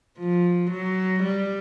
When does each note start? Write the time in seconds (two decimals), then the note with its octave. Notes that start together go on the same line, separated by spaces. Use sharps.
0.19 F3
0.71 F#3
1.23 G3